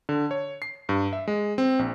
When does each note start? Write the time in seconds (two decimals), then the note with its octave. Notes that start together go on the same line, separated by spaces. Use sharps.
0.09 D3
0.31 C#5
0.62 C7
0.89 G2
1.13 E5
1.28 G#3
1.58 C4
1.79 A#1